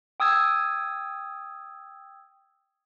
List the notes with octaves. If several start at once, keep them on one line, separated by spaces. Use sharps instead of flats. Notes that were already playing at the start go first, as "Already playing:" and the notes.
G5 D#6 E6 G#6